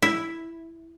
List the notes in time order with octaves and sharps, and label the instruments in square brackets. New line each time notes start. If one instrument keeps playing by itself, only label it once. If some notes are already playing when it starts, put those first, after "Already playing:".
[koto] E4